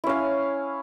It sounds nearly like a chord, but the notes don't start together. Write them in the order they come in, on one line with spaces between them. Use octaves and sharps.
E4 C#4 F5